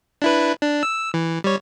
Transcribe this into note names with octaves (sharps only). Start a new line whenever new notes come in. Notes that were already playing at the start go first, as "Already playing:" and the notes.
D4 E4 B4
D4
E6
E3
G3 C#5